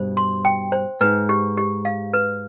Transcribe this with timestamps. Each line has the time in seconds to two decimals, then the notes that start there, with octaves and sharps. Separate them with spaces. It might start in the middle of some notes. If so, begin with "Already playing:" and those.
Already playing: G2 B2 C5
0.17 C6
0.45 G5
0.72 C5
1.01 G#2 B4
1.29 G4
1.57 G4
1.85 F5
2.13 B4